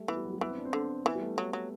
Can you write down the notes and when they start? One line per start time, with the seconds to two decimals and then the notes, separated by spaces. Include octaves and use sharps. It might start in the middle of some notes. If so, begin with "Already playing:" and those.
Already playing: G3 A3
0.08 E3 B3
0.17 G3
0.25 F#3
0.33 G3
0.41 E3 B3
0.50 C4
0.57 D4
0.65 C4
0.73 D3
1.05 E3 B3
1.15 G3
1.22 A3
1.38 F#3
1.53 F#3